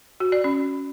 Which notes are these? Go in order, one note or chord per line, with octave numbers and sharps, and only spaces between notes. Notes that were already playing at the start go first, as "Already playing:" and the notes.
F#4
D5
C#4